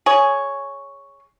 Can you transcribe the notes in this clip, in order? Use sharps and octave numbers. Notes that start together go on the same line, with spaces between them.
G#4 C#5